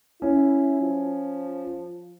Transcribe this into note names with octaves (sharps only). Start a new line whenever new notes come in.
C#4 E4
F3